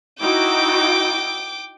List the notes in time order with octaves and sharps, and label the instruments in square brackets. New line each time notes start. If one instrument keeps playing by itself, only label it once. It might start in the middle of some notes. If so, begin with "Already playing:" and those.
[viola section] D#4 E4 F#4 [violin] G5 D6